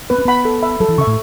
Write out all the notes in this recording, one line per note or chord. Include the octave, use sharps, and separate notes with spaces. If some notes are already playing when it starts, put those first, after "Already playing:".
B3 B4
C#4
B3 F#5 B5
A4
E5 B5
F#3 A4
E3
C#3 E5 C#6
A2